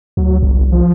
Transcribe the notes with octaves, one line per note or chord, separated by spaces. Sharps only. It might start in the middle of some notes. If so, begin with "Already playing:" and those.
D2 F#3
G1 C2
F3